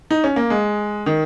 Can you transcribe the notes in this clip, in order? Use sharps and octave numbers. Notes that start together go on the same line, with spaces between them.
D#4
C#4
A#3
G#3
D#3